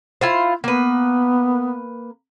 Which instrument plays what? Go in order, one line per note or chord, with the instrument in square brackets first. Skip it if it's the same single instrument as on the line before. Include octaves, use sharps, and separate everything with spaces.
[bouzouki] E4 F4 C5
[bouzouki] A#3 B4 [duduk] B3